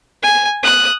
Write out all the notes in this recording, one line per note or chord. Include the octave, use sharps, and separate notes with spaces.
G#5
D#6 F#6